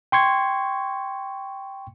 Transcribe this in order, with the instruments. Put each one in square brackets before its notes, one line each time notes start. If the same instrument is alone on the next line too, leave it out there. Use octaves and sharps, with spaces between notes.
[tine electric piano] G5 C6 C#6 G#6